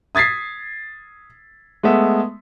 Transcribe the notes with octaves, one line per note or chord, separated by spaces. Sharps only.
D#6 G#6 A6 B6 C7
G#3 A3 B3 E5